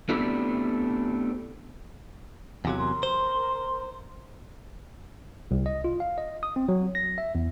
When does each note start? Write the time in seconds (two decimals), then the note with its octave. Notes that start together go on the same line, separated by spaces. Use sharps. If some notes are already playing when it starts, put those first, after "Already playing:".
0.09 A3 B3 C4 D4 E4 G4
2.65 E2 C3 F#3 F4 A4 F5
2.78 A#4 A#5 C6
3.03 C5
5.51 C2
5.66 D#5
5.84 F4
6.00 F5
6.18 D#5
6.43 D#6
6.56 C4
6.69 F#3
6.95 A#6
7.18 E5
7.35 E2